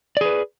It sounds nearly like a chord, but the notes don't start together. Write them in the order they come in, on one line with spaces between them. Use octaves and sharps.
D5 G#4 B4